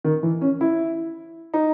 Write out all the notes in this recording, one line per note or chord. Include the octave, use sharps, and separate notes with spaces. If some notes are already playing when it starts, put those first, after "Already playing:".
D#3
E3
C#4
E4
D#4